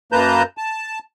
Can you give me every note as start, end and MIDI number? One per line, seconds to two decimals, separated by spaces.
0.12 0.43 42
0.12 0.43 58
0.12 0.43 71
0.12 0.43 81
0.12 0.43 82
0.12 0.43 91
0.58 0.99 81